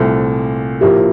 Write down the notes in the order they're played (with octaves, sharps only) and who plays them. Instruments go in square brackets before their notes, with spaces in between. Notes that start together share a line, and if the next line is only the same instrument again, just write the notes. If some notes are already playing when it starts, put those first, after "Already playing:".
Already playing: [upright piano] C2 A#2 A3 C4 [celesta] A4
[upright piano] A#1 A2 F3 A#3 E4 [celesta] G4